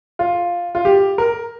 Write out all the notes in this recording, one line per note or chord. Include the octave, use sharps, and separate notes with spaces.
F4
F4
G4
A#4